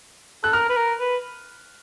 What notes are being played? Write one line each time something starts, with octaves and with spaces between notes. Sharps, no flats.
A4 F#6
A#4 F6
B4
A#4
B4